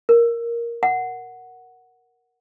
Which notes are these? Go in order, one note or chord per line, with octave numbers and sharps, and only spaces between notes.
A#4
F#5